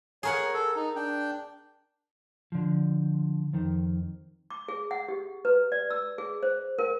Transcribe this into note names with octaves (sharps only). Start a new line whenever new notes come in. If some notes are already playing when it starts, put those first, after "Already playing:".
G#4 A#4 C#5 F#5
A4
D#4
D4 G5
D3 F3
F2 D#3
D6
G#4
F#5
G4
B4
D5
E6
G#4
C5
A#4